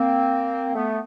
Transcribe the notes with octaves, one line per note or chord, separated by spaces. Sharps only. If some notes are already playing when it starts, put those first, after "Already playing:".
Already playing: A#3 C4
A3 B3